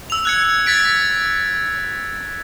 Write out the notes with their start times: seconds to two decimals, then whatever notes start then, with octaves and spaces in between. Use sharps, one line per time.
0.10 E6 F7
0.25 F#6 G#6 C#7
0.66 G#6 A6 B6 D7